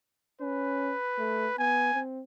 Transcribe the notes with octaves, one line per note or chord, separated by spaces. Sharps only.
C#4 B4
A3
B3 G#5
C4